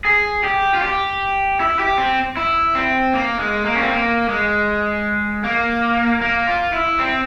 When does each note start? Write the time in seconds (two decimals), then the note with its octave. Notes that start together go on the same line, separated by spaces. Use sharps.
0.05 G#4
0.44 G4
0.75 F4
0.82 G4
1.60 E4
1.79 G4
1.98 C4
2.37 E4
2.75 C4
3.14 A#3
3.39 G#3
3.65 A#3
3.76 C#4
3.83 C4
3.91 A#3
4.29 G#3
5.45 A#3
6.22 A#3
6.48 F4
6.73 E4
6.99 C4